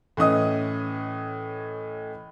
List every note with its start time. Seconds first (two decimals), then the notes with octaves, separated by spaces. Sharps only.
0.17 A2 E3 C#4 D#5 D#6